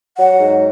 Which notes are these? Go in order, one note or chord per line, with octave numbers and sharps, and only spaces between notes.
F#3 F#5
G#2